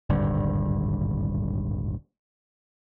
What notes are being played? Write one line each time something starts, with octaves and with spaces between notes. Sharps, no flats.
D#1 G#1 G2 D3